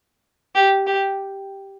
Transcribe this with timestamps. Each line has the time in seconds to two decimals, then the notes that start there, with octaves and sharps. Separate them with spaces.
0.55 G4
0.87 G4